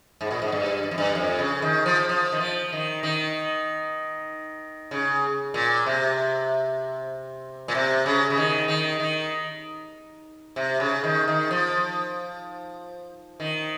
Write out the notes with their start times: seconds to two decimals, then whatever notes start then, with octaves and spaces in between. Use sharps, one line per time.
0.21 G#2
0.31 A#2
0.42 G#2
0.52 G2
0.83 G2
0.91 F2
0.98 G2
1.15 F2
1.39 C#3
1.62 D#3
1.86 F3
2.09 F3
2.32 D#3
2.40 F3
2.73 D#3
3.03 D#3
4.91 C#3
5.54 A#2
5.86 C3
7.68 A#2
7.75 C3
8.06 C#3
8.30 C#3
8.37 D#3
8.68 D#3
9.00 D#3
10.56 C3
10.80 C#3
11.04 D#3
11.28 D#3
11.51 F3
13.40 D#3